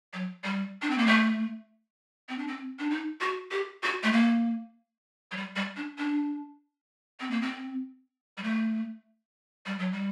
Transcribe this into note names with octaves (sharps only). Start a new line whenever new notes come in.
F#3
G3
D4
C4
A#3
A3
C4
D4
C4
D4
D#4
F#4
G4
F#4
A3
A#3
F#3
G3
G3
D4
D4
C4
A#3
C4
G3
A3
G3
F#3
G3